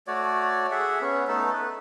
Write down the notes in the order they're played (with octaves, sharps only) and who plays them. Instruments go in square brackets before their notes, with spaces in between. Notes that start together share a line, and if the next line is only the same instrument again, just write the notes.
[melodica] A3 F#4 C#5 D5
G#4 E5 F#5
B3 C#4
A3 B3 D#4 A4
B4